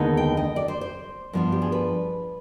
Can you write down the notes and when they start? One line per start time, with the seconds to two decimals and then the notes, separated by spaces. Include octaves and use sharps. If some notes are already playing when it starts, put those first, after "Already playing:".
Already playing: D#2 D3 G#3 B3 D#4
0.17 G5
0.37 D#5
0.56 D5
0.68 C5
0.81 C5
1.33 G2 F3 B3 D4
1.52 G4
1.62 G#4
1.72 B4